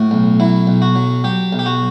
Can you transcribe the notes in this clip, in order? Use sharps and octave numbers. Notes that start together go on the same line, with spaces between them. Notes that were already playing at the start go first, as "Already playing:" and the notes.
Already playing: A2 F#4
B1
F#3 E4
B1
F#4
F#3
F#3 G4
B1
G4
F#4